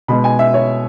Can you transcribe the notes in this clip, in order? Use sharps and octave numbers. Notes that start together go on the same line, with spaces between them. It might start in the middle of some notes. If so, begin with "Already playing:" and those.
B2 G#3 B3 B5
G#5
E5
C#5